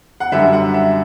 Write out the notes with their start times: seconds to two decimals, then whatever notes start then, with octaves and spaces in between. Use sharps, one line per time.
0.20 F#5
0.32 F#2 D3 G3 E5
0.53 F#5
0.74 E5